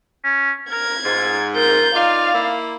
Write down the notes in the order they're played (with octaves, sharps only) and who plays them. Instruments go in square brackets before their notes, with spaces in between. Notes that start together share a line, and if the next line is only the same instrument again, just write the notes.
[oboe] C#4
[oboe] A#4 [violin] G#6
[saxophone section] G#2 [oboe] F4
[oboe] F4 [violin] A#4 G6
[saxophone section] D#4 F4 [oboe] D5 [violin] F5
[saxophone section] A#3 E4